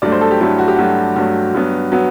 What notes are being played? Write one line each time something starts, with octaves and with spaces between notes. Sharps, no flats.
G2 F#3 A3 D5
C5
A4
G4
G2 F#3 A3 E4
F#4
G4
G2 F#3 A3 F#4
G2 F#3 A3 F#4
G2 F#3 B3
F#3 B3